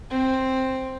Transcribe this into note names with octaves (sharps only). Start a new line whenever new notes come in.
C4